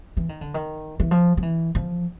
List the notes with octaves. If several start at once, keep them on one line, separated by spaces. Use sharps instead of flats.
E3
D#3
D3
D#3
E3
F3
F3
E3
F3